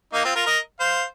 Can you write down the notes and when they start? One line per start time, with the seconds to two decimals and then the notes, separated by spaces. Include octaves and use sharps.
0.13 A#3 D#4
0.24 C4 F4
0.35 F4 A#4
0.46 A#4 D#5
0.80 C5 F5